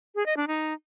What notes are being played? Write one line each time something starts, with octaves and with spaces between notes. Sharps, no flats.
G#4
D#5
D4
D#4